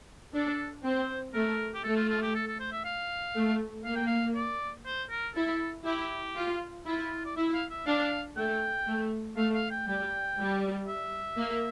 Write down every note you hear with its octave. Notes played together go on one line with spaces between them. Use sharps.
D4 A4
C4 C5
A3 A#4
G4
A3 A4
F4
F4
G4
A4
A4
C5
E5
F5
A3
A#3 F5
G5
F5
D5
C5
A#4
E4 A4
E4 G4
F4
E4 F4
D5
E4 E5
F5
E5
D4 F5
A3 G5
A3
A3 F5
F5
G5
G3 G5
G3
E5
A#3